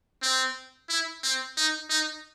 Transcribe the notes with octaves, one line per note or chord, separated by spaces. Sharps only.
C4
E4
C4
D#4
D#4